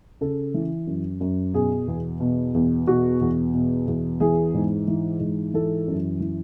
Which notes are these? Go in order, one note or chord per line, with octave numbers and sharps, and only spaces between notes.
C#3 A4
E3
F#2
F#2
B2 G#4
E2
B2
E2
B2 F#4
E2
B2
E2
E3 G#4
G#2
E3
G#2
E3 A4
F#2
E3